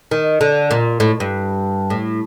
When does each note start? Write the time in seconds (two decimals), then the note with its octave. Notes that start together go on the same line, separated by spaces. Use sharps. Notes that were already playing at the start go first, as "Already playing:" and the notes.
0.11 D#3
0.41 D3
0.71 A#2
1.00 A2
1.20 G2
1.90 A2